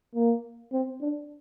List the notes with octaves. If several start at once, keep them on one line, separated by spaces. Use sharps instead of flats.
A#3
C4
D4